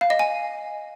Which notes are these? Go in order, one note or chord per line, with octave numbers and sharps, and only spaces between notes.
F5
D#5
G#5